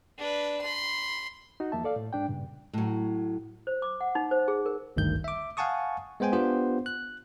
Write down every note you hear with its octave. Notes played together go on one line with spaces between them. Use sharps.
D4 B4
B5 C6
D#4 F#4
E2 F3 A#3 E5 A5
A4 D5 F5
A2
G#2 D4 G5
G2 A#2 C#3
A2 F#3
C5
D6
F#5
D#4
C5
G#4
A#4
G#1 D2 G2 D#3 G6
E5 D6
F5 F#5 G#5 A5 C#6 D#6
G#3 B3 C5 G5 G#5
B3 D4 F4 G4 C5
F#6